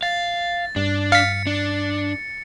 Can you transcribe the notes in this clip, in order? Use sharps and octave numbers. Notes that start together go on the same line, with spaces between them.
F5 A6
G2 D4
F5 B6 C#7
D4